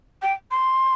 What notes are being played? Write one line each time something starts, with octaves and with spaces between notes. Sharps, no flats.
G5
C6